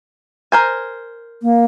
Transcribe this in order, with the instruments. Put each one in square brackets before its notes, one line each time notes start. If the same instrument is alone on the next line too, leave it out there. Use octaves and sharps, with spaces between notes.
[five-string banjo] A#4 C5 G#5
[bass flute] A#3